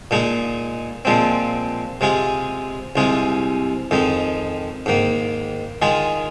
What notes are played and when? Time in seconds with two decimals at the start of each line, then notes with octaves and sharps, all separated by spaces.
0.11 A#2 G#3 D#4 G#4
1.05 A#2 F3 G#3 C4
2.01 C3 G#3 F4 G#4
2.96 C2 C3 G#3 F4 G#4
3.91 F2 D#3 G#3 D#4
4.86 G#2 D#3 A#3
5.82 D#3 G#3 F4 G#4